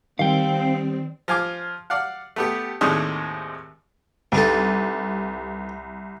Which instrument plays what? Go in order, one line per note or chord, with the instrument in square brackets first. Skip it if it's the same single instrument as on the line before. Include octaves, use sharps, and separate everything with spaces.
[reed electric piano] D#3 [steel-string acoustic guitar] G3 [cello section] C4 [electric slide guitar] F5 G5
[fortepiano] F3 F5 G#5 D6 F6
D5 F5 F#5
A3 B3 G4
D#2 A2 C3 G#3 D4 D#4
[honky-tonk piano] C2 [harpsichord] G2 D#4 A4